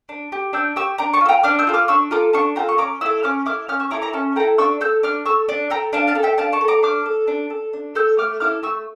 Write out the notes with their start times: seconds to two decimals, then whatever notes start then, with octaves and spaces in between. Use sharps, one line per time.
0.09 D4
0.32 G4
0.53 D4 E6 G6
0.76 G4 C#6 E6
0.98 D4 A#5 D6
1.13 A5 C#6
1.21 F4 A4
1.29 G5 A#5
1.43 D4 D6 F6
1.59 E6 G6
1.67 F4 A4
1.74 D6 F6
1.88 D4 C#6 E6
2.11 F4 A4 A#5 D6
2.33 D4 A5 C#6
2.55 F4 A4 G5 A#5
2.69 C#6
2.78 C#4 A#5 D6
3.01 E4 C#6 E6
3.06 A4
3.23 C#4 D6 F6
3.46 E4 A4 D6 F6
3.68 C#4 D6 F6
3.80 C#6 E6
3.91 E4 A4 A#5 D6
4.02 A#5 D6
4.13 C#4 A5 C#6
4.36 A4 G5 A#5
4.40 E4
4.58 D4 C#6 E6
4.81 A4 E6 G6
5.03 D4 D6 F6
5.26 A4 C#6 E6
5.49 D4
5.70 A4 G5 A#5
5.93 D4 F5 A5
6.07 F5 A5
6.15 A4
6.23 E5 G5
6.38 D4 F5 A5
6.53 A5 C#6
6.61 A4
6.68 A#5 D6
6.83 D4 D6 F6
7.06 A4
7.27 D4
7.50 A4
7.73 D4
7.95 A4 E6 G6
8.18 A3 D6 F6
8.40 E4 A4 D6 F6
8.63 A3 C#6 E6